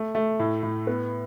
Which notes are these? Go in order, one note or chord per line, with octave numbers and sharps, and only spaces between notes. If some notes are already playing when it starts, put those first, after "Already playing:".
Already playing: A3
A3
A2
A2
B3